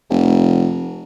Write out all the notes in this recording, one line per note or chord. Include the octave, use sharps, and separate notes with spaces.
F1